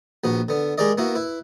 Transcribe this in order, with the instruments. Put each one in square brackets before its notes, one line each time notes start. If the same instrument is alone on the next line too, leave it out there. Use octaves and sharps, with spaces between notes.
[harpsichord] A#1 B3 F#4
D3 B3
G#3 G4 G#4 A#4 D5 D#5
A#3 B3 E4 F#4
E4 B4